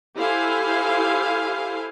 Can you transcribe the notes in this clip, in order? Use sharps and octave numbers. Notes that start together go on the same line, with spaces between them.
E4 G4 A4 C5 F5 G#5